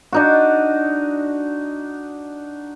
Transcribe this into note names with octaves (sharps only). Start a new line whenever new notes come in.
D4 D#4 F#4